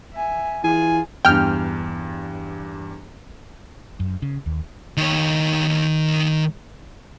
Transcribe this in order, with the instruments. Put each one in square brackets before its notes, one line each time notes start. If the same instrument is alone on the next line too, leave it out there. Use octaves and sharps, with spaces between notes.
[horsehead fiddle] E5 G#5
[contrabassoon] E3 [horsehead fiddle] F4 G#4 [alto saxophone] G#5
[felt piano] E2 G2 [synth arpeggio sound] G5 F6
[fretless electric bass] F#2
C#3
D#2
[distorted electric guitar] D#3 C#5